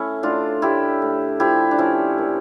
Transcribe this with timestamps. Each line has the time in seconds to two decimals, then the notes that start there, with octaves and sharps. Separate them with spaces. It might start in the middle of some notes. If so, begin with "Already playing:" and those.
Already playing: A3 C#4 E4
0.23 A2 D4 F4
0.62 A2 E4 G4
1.02 A2
1.40 F3 E4 G4
1.71 D4
1.78 F3 C#4 E4
2.18 A#2